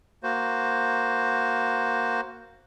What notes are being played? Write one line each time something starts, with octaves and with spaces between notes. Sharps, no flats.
A#3 F#4 C5